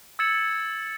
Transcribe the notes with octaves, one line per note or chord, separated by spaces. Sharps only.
E6 G#6 A6 C#7 E7 F#7